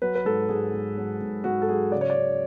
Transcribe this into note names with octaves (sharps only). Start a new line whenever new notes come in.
F#3 B4
B4
G#2 A4
G#2 G#4
G#2
F#3
G#2
G#2 F#4
A4
F#3 G#4
C#3 D5
C#5
D5
C#3